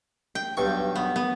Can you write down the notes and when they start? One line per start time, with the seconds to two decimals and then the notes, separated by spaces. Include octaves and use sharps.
0.35 G5
0.57 B1 G2 C#6
0.96 B3
1.16 B3